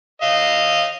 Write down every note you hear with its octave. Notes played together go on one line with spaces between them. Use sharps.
D#5 F5